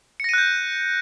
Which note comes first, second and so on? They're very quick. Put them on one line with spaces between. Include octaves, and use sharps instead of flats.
C#7 A#6 D#7 F#6 G6